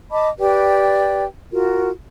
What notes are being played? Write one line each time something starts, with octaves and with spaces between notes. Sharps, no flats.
D#5 A5 B5 D6
G4 B4 D5 G5
F4 F#4 A#4